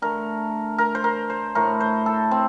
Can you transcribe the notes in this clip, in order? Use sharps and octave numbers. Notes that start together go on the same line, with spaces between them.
D3 A3 A#4
A#4
C5
A#4
C5
A2 A3 A#4
C5
A4
C4